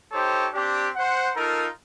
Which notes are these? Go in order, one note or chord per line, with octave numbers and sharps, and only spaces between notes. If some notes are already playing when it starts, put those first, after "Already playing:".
D#4 G4 A4 C5 C#5
C4 D4 G4
C5 F#5
D#4 F4 A4 A#4